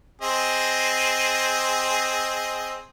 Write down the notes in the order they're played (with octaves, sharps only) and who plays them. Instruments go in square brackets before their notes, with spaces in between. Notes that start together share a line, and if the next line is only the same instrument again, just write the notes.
[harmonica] C4 G#4 D#5